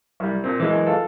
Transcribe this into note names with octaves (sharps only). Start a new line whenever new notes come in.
C2 G3
A#2 C4
F#2 E3 G#3
F4 A4